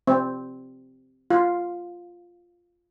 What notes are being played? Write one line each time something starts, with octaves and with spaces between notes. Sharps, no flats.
C4
F4